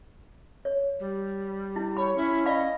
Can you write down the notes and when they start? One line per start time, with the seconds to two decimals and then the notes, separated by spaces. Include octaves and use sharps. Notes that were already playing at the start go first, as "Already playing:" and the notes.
0.65 C#5
1.00 G3
1.76 E4
1.97 C#5 B5
2.16 C#4 E4
2.46 D5 D#5 F5 B5